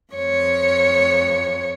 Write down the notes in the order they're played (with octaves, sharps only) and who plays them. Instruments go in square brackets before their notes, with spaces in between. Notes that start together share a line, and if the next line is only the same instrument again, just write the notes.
[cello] F2 C#5